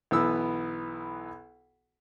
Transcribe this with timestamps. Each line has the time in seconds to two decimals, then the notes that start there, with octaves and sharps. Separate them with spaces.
0.11 B1 E3 B3 E6